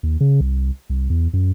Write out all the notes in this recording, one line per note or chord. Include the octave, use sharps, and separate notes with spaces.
D#2
C#3
C2
C2
E2
F#2